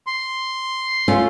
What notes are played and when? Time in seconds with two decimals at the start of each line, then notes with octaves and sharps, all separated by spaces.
0.07 C6
1.08 A3 C#4 F4